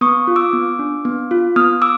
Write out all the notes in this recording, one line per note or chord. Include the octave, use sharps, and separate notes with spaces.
B3 C#6 D#6
F4
D6 E6
B3
D4
B3
F4
B3 D#6 F6
D6 E6